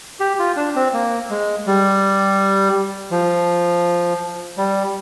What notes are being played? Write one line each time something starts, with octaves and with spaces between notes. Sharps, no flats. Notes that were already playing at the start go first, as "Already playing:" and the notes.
G4
F4
D4
C4
A#3
G#3
G3
F3
G3